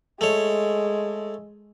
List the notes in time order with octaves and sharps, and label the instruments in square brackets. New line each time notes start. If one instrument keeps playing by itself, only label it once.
[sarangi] G#3 [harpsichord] A3 C#5